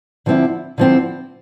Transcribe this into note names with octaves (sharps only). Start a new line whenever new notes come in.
D3 F3 C4 E4
D3 F3 C4 E4